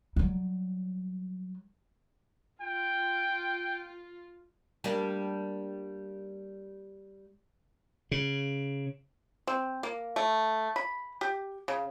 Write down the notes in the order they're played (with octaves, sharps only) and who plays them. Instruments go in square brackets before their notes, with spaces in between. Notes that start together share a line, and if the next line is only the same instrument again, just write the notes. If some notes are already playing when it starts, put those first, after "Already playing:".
[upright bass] F#3 G3
[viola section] F4 [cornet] G5
[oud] G3 A#3 D4
[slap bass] C#3
[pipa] C4
A#3
A3
B5
G4
C#3